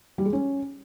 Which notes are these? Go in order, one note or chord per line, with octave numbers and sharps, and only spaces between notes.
G3
G#3
C#4